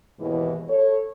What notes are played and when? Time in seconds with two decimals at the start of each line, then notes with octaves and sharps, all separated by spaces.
0.20 D#2 G#2 B2 E3
0.69 A4 C#5